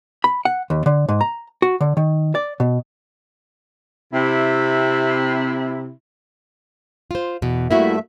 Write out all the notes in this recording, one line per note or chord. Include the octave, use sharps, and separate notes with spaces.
B5
F#5
D#2
D3
G#2
A#5
F#4
D3
D#3
D5
B2
C3 E4
F4 C5
E2 B2
G2 A3 A#3 E4 F#4 E5